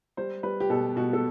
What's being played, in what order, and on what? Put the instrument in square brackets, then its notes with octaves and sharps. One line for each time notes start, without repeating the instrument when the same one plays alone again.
[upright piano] G3 C5
G3 B4
G4
B2 A4
B2 F#4
A4